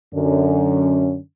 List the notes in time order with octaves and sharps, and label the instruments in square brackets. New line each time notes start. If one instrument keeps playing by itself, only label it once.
[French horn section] F#2 D3 C#4